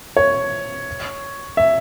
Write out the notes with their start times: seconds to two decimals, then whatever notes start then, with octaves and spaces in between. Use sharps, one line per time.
0.17 C#5
1.57 E5